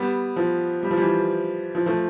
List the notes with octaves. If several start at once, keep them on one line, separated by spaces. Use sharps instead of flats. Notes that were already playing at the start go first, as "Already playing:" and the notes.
Already playing: G3 B3
F3
G3
F3
E3 G3
F3
F3 A3